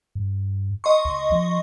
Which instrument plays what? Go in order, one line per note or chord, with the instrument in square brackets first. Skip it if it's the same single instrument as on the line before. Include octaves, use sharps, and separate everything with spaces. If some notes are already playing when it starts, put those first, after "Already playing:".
[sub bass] G2
[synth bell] D#5 C6 C#6
[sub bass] C#2
F3